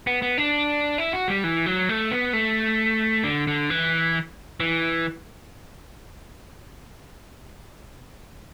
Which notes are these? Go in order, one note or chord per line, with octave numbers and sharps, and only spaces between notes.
B3
B3
D4
E4
F#4
G3
E3
F#3
A3
B3
A3
D3
D3
E3
E3